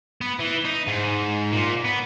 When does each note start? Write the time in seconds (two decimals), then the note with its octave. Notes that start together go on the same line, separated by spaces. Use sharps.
0.21 B3
0.39 E3
0.65 D#4
0.87 G#2
1.52 A#2
1.84 B3